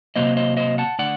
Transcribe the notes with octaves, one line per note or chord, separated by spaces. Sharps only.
C3 D#3 F#3 A#3 C5 D#5
C5 D#5
C5 D#5
F#5 A5
D3 A3 D5 F#5